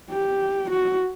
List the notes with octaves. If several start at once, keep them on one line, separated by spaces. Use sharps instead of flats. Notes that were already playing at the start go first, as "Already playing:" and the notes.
G4
F#4